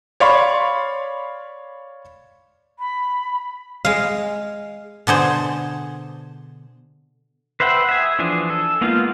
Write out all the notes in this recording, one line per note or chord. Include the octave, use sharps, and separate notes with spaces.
C#5 D5 F5 B5 C6
B5
G#3 F5
B2 D3 G#4 C5
B4 C5 E5 F#5 G5
G#4 E5
E3 F3 D4 G#4
A4
G#3 A#3 B3 D#4 F4